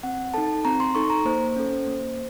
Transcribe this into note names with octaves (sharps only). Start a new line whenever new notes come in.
C4 F#5
D#4 A4 A5
C4 A#5
C6
D#4 A4 C#6
A#5
A#3 C5
C#4 A4
A#3